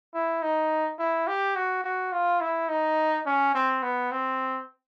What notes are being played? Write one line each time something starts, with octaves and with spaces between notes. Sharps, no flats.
E4
D#4
E4
G4
F#4
F#4
F4
E4
D#4
C#4
C4
B3
C4